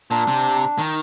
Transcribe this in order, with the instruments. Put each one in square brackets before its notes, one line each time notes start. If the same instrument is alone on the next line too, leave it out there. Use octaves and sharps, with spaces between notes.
[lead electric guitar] A#2 [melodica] D4
[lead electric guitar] C3
D#3